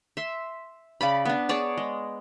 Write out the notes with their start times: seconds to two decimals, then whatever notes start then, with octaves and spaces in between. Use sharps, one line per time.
0.17 E5 C6
1.01 C#3 D5 B5
1.25 B3 D4
1.49 G#4 C#5 D5 A5
1.77 G#3